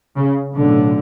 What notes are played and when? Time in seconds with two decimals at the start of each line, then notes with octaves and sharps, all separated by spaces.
0.16 C#3
0.54 B1 A2 D3